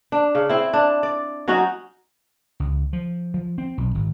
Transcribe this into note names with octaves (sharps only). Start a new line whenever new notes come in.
D4
C#3
C4 E4
D4
D5
F#3 C#4 D#4 F#4
C#2
F3
F3
C4
B1
G#1